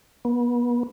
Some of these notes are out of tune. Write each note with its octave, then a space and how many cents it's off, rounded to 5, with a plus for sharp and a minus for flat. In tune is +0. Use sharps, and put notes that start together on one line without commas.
B3 -35